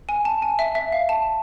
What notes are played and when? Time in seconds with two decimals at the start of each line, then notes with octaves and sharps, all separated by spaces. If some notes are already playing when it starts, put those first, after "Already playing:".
0.09 G#5
0.25 A5
0.42 G#5
0.59 E5
0.75 E5
0.92 F5
1.09 A5